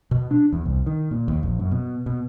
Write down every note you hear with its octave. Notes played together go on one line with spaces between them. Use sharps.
B2
D4
E2
C2
D#3
A#2
D#2
A#1
F#2
B2
B2